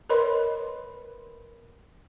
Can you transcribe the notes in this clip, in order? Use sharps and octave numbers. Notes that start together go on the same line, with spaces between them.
A#4 B4 C#5 D#5 B5 C6